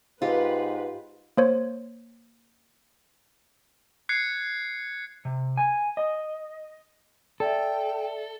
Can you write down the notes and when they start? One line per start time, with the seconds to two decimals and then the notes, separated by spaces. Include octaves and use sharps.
0.22 G#2 F4 G4 B4
1.37 A#3 C5 C#5
4.09 F#6 G#6 C7 C#7
5.25 C3
5.57 G#5
5.97 D#5
7.40 A4 D5 E5 G5